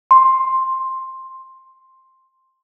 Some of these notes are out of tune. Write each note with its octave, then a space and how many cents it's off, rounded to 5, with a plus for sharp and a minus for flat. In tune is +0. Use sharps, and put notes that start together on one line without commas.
C6 +10